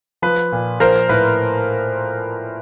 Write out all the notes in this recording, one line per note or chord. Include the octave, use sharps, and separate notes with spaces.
F3 B4
A#2
F3 A#4 C5
A2 B4